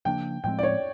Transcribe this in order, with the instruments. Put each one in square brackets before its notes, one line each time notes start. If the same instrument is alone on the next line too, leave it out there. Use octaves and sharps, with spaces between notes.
[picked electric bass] C#3 F3 A#3 D4 [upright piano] G5
[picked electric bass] A2 F3 G#3 C4 [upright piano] G5
[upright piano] D5
C#5